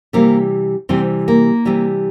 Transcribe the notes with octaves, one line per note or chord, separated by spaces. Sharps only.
C3 E3 G3 A#3
C3 E3 G3 C4
A#3
C3 E3 G3